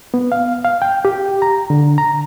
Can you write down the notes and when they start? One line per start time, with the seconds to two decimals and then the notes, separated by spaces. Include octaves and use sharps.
0.14 B3
0.32 F5
0.65 F5
0.82 G5
1.05 G4
1.42 A#5
1.70 D3
1.98 A#5